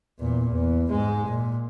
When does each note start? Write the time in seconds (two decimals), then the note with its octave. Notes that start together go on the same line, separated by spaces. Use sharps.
0.20 E2 A#2
0.51 E2
0.90 G#2 G#3
1.27 A#2